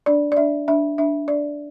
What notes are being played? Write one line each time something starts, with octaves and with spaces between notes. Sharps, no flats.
D4 D5
D5
D4 E5
D4 E5
D4 E5
D4 D5